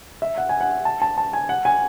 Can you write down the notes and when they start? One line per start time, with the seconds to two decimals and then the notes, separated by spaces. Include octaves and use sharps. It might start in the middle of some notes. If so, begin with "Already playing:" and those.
0.22 E5
0.38 F#5
0.49 G#5
0.61 F#5
0.85 A5
1.02 A5
1.18 A5
1.33 G#5
1.49 F#5
1.65 G#5